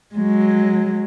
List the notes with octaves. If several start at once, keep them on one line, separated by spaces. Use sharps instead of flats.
F#3 G#3